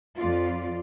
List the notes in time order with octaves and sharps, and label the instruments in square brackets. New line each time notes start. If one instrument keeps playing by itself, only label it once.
[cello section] F2 F4 D5